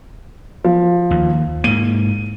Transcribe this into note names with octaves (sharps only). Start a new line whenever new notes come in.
F3
D#2
G#2 A#3 D#7